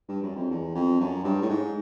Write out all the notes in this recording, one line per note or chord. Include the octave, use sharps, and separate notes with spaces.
G2
F#2
F2
E2
F2
F#2
G2
A2
G#2